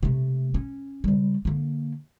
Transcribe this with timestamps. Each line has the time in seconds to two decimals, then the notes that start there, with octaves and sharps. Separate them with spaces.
0.03 C3 A3
0.54 C#4
1.04 C#3 G3
1.45 D3 A#3